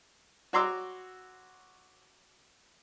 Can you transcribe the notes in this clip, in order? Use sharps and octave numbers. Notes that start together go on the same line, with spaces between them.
F#4 C#5 A#5 C6 D6 E6